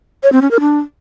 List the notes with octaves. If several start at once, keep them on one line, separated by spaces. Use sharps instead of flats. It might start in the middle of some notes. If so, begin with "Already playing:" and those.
C#5
C4
C#4
A#4
D4